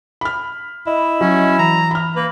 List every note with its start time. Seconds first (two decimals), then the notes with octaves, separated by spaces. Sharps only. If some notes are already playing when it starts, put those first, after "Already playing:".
0.21 B5 F6
0.87 E4 D#5
1.21 F#3 C#4
1.59 E3 A#5
1.91 B5 F6
2.16 A#3 B4